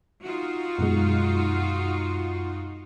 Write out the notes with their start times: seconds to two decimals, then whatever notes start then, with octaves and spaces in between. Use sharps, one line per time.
0.22 D#4 F4 F#4
0.79 F#2 B2 G#3